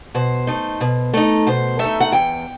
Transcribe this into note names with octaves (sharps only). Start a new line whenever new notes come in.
B2 C5
A3 D#4
B2
A3 D#4
B2 C5
A3 D#4 E5
F#5
E2 G5